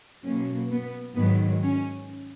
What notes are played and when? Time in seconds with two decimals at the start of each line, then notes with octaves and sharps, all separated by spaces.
0.25 B2 F#3 A#3 C#4
0.71 B3
1.16 G#2 D#3 F#3 B3
1.62 C#4